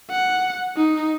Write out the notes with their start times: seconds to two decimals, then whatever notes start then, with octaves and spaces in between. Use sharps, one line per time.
0.11 F#5
0.77 D#4